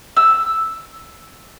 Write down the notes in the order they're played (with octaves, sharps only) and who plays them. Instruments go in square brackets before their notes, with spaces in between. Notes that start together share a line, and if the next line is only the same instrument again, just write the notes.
[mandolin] E6